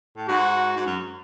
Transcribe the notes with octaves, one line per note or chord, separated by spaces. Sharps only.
A2
G#2 F#4
G#2
F#2